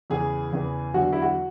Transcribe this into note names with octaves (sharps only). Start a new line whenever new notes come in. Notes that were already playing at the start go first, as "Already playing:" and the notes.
E2 C#3 E3 G#4
E2 C#3 E3
E2 D3 F#3 F#4
E4
F#4